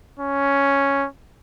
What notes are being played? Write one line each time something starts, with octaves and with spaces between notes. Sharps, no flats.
C#4